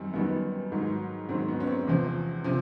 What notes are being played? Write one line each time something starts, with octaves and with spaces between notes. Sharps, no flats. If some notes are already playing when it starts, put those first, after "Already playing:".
Already playing: F#2 D#3 G3 C4
F#2 D#3 G3 B3
G#2 D#3 F#3
G#2 D#3 F#3 C4
B3
C#4
C4
E2 C3 F3
C3 F3